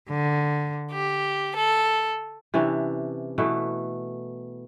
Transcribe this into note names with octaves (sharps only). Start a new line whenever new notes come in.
D3
G4
A4
C3 E3 C#4 D4
B2 E3 A3